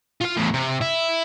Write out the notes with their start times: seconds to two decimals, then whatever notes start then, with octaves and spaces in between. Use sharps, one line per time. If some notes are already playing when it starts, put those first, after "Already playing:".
0.21 F4 F5
0.37 E2 A2
0.54 C3
0.81 E4